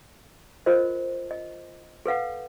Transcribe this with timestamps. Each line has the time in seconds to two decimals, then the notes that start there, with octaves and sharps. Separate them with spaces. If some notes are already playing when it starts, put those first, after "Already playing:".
0.66 F4 A#4 C5 D#5
1.31 D#5
2.06 A4 B4 F5 F#5